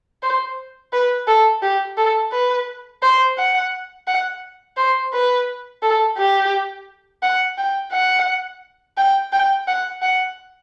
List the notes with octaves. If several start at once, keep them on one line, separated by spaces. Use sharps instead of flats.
C5
B4
A4
G4
A4
B4
C5
F#5
F#5
C5
B4
A4
G4
F#5
G5
F#5
G5
G5
F#5
F#5